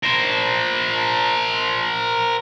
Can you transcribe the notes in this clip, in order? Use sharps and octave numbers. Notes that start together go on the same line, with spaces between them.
A#4 C5